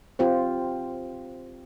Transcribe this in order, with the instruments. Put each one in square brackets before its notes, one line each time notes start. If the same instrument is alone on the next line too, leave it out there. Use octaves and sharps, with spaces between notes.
[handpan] C4 F4 G4 C5